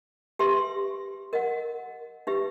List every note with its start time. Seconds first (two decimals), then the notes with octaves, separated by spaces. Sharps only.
0.39 G4 B4 E5 A5 C6
1.33 A#4 D#5 F#5
2.27 D#4 G4 B4 E5